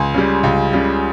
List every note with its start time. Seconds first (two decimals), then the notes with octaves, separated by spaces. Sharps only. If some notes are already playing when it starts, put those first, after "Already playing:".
Already playing: C#2 G#5
0.14 C#3 G3
0.43 C#2
0.73 C#3 G3